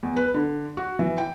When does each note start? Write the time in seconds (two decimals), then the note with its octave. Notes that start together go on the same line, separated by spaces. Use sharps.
0.03 E2
0.16 B4
0.34 D3
0.77 F#4
0.99 E3
1.18 G5